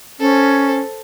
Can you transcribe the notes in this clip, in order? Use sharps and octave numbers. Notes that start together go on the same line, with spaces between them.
C#4 A4 C5